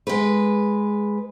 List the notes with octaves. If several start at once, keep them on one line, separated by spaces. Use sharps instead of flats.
G#3 B4